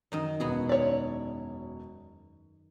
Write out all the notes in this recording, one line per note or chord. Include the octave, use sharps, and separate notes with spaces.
F#2 D#3 D#5
E1 B2 B3 F#4 G#4
C#5 D5